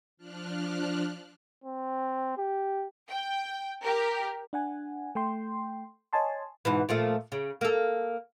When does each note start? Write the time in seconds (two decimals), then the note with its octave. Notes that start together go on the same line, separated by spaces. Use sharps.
0.17 F3 D4 F6 F#6
1.64 C4
2.37 G4
3.10 G5
3.83 G4 A#4
4.53 D4 F#5 G#5
5.15 A3 G5 C6
6.13 C#5 D#5 G#5 A5 C6
6.65 G#2 B2 E3
6.89 A#2 F3 A3
7.32 C#3
7.61 A#3 A4